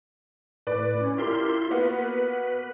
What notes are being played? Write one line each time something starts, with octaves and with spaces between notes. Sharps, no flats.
A2 B4 D5
C#4
E4 F4 G4 A#4 C6
A#3 B3 F#4 B4